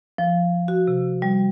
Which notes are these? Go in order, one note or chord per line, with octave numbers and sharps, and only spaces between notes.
F3
F#4
C3
G3